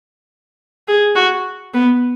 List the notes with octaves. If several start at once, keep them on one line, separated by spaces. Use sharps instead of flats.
G#4
F#4
B3